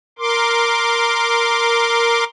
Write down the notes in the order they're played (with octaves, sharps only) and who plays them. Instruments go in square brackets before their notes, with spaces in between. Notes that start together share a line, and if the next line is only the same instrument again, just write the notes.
[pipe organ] A#4 C6 D6